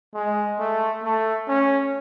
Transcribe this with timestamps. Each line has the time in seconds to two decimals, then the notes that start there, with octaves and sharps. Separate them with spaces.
0.14 G#3
0.59 A3
1.04 A3
1.48 C#4